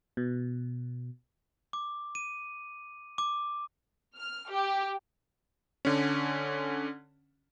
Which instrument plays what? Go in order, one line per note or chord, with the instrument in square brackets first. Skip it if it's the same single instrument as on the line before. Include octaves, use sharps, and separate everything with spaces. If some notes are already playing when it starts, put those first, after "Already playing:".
[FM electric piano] B2
[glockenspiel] D6
D#7
D6
[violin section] F6
G4
[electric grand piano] D3 C#4